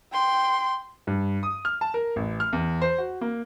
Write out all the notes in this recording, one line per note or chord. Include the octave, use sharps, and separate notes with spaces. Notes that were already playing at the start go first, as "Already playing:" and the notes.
G5 C6
G2
D#6
F6
A5
A#4
A1
F6
E2
C5
F#4
A#3